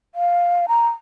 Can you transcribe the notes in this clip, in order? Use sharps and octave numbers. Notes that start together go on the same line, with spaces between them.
F5
A#5